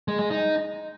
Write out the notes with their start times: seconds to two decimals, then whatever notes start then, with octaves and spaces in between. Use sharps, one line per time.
0.08 G#3
0.19 G#3
0.30 D#4